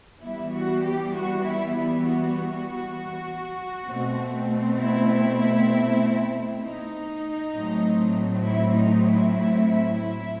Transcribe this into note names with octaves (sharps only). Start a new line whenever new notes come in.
E3 G3 B3 E4
F#4
G4
F#4
E4
E4
F#4
B2 A3 C4
E4
D#4
A2 F#3 A3 C4
E4
D#4
E4
E4
E4
E4